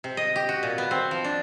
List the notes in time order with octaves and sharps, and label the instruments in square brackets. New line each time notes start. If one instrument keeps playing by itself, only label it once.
[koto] C3
D#5
G4
F#4
A#2
B3
C4
F3
D4